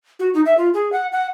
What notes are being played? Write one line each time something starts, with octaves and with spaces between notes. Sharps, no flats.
F#4
D#4
E5
F4
G#4
F#5
F#5